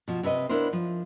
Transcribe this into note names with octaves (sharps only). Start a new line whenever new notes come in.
B2 F3
C3 C4 B4 D#5
B3 D4 E4 A#4 C5
F3